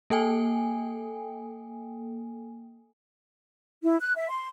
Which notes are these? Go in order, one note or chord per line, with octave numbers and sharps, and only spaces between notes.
A#3 A4 G5 G#5
E4
F#6
E5
C6